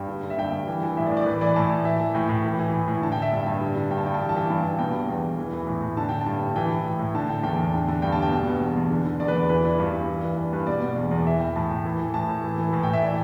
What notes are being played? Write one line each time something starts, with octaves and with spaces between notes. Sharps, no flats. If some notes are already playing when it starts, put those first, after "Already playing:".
Already playing: G2 G5
D3
D3
E5
G2 G5
G2
E3
E3
A2 E5
D5
A2
D5
E3 B4
E3 D5
A2 A5
A2
E3 E5
E3
A2 G5
A2
E3
E3
A2
A2
D3 A5
G5
D3 E5
G2 E5
G2
D3
D3
G2 G5
A5
G2 G5
A5
E3 G5
A5
E3 G5
G2
G2
B2 G5
B2
E2
E2
E3
E3
A2
A2
D3 A5
D3 G5
G2 A5
G2
E3 G5
E3
A2
A2
D3 A5
D3 G5
E2 G5
E2
D3
D3
G2 G5
A5
G2
G5
B2 A5
B2
E2
E2
D3
D3
E2 D5
B4
E2 D5
E3 B4
E3 D5
G2 B4
G2
E3
E3
G2 D5
G2 B4
B2 D5
B2
E2
E2
E3 E5
E3 G5
A2 A5
A2
E3
E3
A2 A5
A2
E3
E3
A2 A5
G5
A2
E5
E3 D5